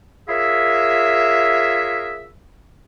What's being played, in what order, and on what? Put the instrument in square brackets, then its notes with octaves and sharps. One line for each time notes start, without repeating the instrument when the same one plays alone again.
[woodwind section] F4 G#4 A#4 C#5 E5